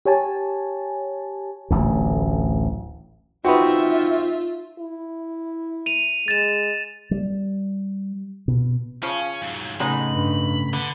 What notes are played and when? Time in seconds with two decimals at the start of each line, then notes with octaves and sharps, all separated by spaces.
0.06 G4 C#5 G#5 A5
1.71 D1 A1 D2
3.45 B3 C4 D#4 F4 F#4 E5
4.79 E4
5.86 D#7 F7
6.28 G#3 A6 E7
7.11 G3
8.48 B2
9.03 C#3 F3 C#4
9.42 G#2 F#3
9.80 A2 C#3 G#3 B3 D#4 B5
10.11 G2
10.73 D3 B3